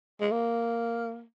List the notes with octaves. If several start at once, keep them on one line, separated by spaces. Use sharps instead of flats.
G#3
A#3